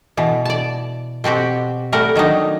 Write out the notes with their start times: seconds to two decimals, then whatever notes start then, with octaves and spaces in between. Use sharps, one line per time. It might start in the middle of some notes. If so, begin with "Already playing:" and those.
0.17 B2 E3
0.45 D5 A5
1.24 B2 C4 F#4 G4
1.92 G3 A3 A#4 F#5
2.15 D#3 F#3 D4 D#4